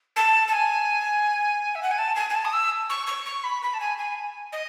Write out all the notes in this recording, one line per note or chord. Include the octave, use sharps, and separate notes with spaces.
A5
A5
G#5
E5
F#5
G#5
A5
G#5
G#5
A5
D#6
E6
C#6
C#6
C#6
B5
B5
A5
G#5
G#5
D#5